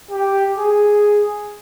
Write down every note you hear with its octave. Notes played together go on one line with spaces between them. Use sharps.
G4
G#4